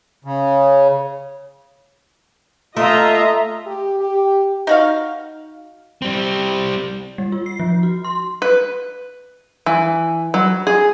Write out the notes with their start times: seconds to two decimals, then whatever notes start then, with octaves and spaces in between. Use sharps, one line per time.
0.25 C#3
2.77 A3 F4 D#5 E5 A#5
3.66 G4
4.00 G4
4.67 D#4 F#4 F5
6.02 G3 C4
7.18 G3
7.32 F4
7.46 C7
7.60 F3
7.83 F#4
8.04 C6
8.42 B4
9.66 E3
10.34 F#3
10.67 G#4